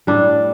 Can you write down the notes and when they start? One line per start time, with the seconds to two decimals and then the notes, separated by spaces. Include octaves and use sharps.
0.07 A2 G3 D4